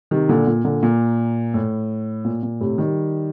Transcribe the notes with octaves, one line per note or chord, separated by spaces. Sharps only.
C3 D#3
A#2 D3
A#2
A#2 D3
A#2
A2
A#2
A#2
A2 C3
D#3 G3